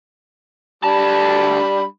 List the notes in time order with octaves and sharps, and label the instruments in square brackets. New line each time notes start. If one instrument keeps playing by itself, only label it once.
[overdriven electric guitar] D2 A5 [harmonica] G3 D4 B5